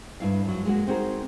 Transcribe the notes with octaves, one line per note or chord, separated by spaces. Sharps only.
G2 E4 F5
F#2 F#3
G#3 A#3 F#4
C4 D#4 F#4 G#4 A#4